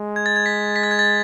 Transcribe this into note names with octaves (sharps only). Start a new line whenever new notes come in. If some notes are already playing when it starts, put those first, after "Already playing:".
Already playing: G#3
G#6
A6
G#6
B6
B6
A6
G#6
A6